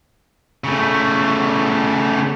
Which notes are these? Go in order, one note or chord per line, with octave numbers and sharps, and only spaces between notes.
C#3 A3